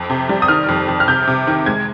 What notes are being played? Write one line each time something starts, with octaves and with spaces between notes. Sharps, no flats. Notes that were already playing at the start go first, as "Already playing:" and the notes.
Already playing: F2
C3
G3
D#6
D#3 F6
F2
F2
F6
C3 G6
C3
D#3
G#3 G#6